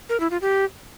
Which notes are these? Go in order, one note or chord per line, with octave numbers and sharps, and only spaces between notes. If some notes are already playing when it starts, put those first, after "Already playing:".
A#4
E4
F4
G4